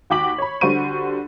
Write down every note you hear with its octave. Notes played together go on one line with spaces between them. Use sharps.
D#2 F#4 G5 D6 B6 F#7
C#5 B5
D3 G3 F#4 C5 C#6 D#7